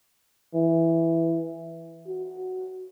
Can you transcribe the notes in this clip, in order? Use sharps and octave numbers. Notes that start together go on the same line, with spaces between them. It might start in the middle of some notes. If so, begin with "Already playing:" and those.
E3
F#4